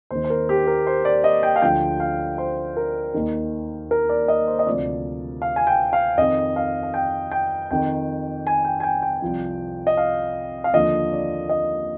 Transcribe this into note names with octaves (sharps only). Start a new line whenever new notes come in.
D#2 D#3 C5
C5
A#4
G4
A#4
C5
D5
D#5
G5
F5
D2 D3 F3 G5
F5
C5
A#4
D#2 D#3
A#4
D5
D#5
C5
D#5
D2 C3 F3 D5
F5
G#5
G5
F5
F2 D#3 D#5
F5
F5
G5
G5
F2 D#3 G5
G#5
G5
G#5
G5
G5
C2 C3 F3
D#5
F5
F5
D#2 D3 F3 D#5
D5
D#5